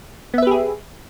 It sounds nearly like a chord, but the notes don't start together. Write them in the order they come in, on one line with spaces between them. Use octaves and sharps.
B3 E5 B4 G4 G#4